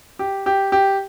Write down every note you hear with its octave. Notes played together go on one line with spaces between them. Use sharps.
G4
G4
G4